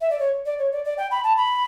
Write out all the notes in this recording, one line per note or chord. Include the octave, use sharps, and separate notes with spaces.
E5
D5
C#5
D5
C#5
D5
D5
G5
B5
A5
B5